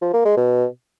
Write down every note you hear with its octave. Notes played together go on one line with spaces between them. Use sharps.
F3
A#3
G#3
B2